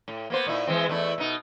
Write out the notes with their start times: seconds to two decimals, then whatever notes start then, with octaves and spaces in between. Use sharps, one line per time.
0.08 A2
0.30 A#3 B3 C5
0.47 A#2 D#4 E4
0.67 E3 G#3 C4
0.89 E2 A3 E4
1.18 B2 D#4